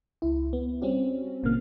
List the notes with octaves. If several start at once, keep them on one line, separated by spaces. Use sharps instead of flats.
C#2 E4
B3
G3 C4 C#4 F#4
G1 A#2 C#3 E3 A#3 F6